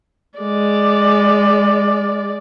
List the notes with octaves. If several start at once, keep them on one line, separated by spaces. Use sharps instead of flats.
G#3 D5